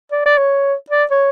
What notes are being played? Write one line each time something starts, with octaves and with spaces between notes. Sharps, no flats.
D5
D5
C#5
D5
C#5